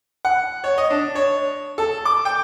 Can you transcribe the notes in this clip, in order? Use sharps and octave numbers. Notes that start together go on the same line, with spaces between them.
F#5
C#5
D#5
D4
C#5
A4
D6
G5